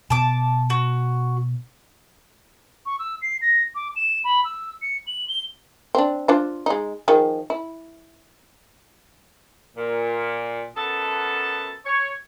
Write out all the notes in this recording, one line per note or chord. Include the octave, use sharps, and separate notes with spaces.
B2 B3 A5 D6
F#4
C#6
E6
C7
A#6
D6
E7
B5
E6
C#7
F#7
G7
C4 D4
D4 F4 C5
G#3 D#4
D#3 F3 G#4
E4
A#2
F#2 B3 A4 A5
C#5